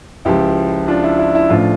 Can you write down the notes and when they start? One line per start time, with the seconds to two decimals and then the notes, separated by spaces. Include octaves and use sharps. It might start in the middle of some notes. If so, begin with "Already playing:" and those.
0.25 C#2 C#3 F3 E4 G4
0.88 D4 F4
1.04 E4
1.19 E4
1.35 E4
1.50 A1 A2 F3 D4 F4